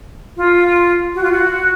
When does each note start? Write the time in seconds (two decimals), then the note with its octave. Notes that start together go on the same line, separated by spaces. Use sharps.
0.37 F4
1.15 F#4
1.23 F4
1.32 F#4